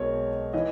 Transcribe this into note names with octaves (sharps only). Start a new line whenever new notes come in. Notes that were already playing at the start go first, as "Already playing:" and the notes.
Already playing: B1 B2 G#3 A#4 C#5
E3 D#5